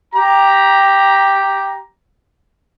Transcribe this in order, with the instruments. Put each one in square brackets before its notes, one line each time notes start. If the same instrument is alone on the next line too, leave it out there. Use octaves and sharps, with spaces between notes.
[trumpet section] G4 A#5